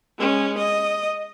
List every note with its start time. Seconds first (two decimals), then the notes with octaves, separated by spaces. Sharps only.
0.19 G#3 C#4
0.58 D#5